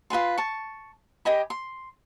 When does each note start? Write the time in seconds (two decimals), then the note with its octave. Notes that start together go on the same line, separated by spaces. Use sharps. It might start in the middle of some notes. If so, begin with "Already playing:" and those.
0.10 F4 B4 G#5 C6
0.38 A5 C#6
1.25 G4 D#5 G#5 B5
1.50 C6